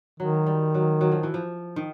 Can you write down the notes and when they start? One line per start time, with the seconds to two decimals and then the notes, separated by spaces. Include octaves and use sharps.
0.20 D#3 F#3
0.47 G3
0.74 F#3
1.01 F#3
1.12 F3
1.23 E3
1.34 F3
1.76 D#3